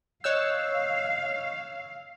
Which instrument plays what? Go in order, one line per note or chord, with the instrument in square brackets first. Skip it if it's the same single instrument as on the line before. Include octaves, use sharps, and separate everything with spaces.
[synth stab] C#5 E6 [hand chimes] D#5 F#6 G6 [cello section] F5